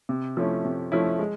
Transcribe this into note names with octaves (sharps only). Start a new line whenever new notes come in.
C3
F3 A3 C#4 E4
C3
F3 A3 C#4 E4
G#3